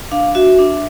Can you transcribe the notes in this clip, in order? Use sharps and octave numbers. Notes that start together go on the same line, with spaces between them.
D4 F5
F#4 E5
D4